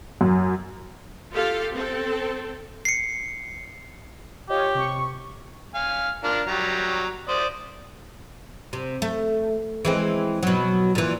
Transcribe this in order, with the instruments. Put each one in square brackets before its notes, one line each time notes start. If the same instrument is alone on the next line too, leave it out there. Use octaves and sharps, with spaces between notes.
[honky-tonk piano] F#2
[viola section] F4 G4 A4 F5
C4 A4
[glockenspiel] C7 C#7
[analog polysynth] F4 C#5 D#5 [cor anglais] G4
[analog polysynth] C3 C#6
[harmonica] F5 G#5
D4 F4 A#4
F#3 G3 A#5
C5 D5 D#6
[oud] C3
A3
E3 G#3 C4
B2 F#3
A#2 E3